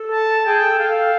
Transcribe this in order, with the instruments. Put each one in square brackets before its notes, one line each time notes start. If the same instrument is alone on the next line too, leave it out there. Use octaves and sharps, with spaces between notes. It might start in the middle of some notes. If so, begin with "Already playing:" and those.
Already playing: [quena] A4
[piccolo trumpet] A5
[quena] G#4 [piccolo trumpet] G5
[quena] A4
[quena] A4 [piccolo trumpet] F5